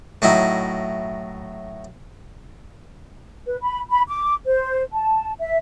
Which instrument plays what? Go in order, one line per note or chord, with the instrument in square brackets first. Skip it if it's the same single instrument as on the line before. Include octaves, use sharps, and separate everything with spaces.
[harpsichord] A2 F#3 D#4 E4
[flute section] B4
B5
B5
D6
C5
A5
E5